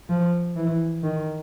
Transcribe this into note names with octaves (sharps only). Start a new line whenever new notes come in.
F3
E3
D#3